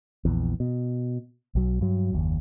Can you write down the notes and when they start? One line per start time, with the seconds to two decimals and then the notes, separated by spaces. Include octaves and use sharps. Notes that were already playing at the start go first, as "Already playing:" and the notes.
0.25 A#1 E2
0.60 B2
1.55 B1 F#3
1.81 G2 F#3
2.13 F#1 D#2